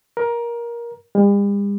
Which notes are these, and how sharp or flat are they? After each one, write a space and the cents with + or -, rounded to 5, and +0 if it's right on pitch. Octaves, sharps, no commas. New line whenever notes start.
A#4 +20
G3 +45